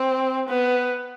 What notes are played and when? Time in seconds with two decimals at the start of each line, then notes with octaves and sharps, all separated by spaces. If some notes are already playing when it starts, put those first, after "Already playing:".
Already playing: C4
0.48 B3